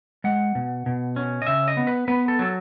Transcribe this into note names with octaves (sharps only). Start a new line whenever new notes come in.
G#3 F#5
B2
B2
C#4
D#5
C#3 E5
D#5
B3
B4
B3 B4
A4
F#3 A4